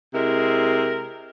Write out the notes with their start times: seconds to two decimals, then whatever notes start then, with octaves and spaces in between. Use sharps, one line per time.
0.14 C3 G#3 E4 A#4